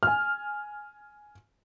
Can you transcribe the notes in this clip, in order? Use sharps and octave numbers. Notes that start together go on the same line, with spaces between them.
G#5 F6